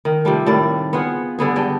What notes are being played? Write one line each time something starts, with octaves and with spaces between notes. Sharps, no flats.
D#3
C3 F3 G3 A3
A2 D#3 G3 D5
B3 F4 G#4 F#5
G2 D3 B3 G#4
G2 D4 D#5 G5